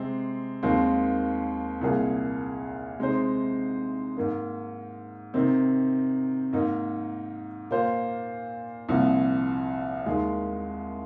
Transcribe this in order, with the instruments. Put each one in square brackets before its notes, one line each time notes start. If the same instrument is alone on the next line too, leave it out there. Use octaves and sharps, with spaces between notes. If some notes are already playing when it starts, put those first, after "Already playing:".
Already playing: [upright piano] C3 G#3 C4
D#2 D#3 G#3 C4 F4
C2 A#2 A#3 G#4
C3 G#3 D#4 C5
G#2 D#3 A#3
C3 D#3 C4 D#4
G#2 D#3 A#3 D#4
A#2 A#3 F4 C5
C2 A#2 F3
D#2 D#3 G#3 F4